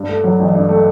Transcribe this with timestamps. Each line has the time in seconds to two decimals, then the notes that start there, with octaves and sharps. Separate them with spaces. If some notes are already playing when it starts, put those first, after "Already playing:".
Already playing: G2
0.08 A3
0.24 F#3
0.39 A1
0.55 G2
0.69 A3